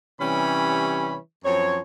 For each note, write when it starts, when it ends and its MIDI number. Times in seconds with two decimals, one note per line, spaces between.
0.21 1.17 48
0.21 1.17 52
0.21 1.17 55
0.21 1.17 61
0.21 1.17 73
0.21 1.17 83
1.45 1.79 42
1.45 1.79 53
1.45 1.79 60
1.45 1.79 73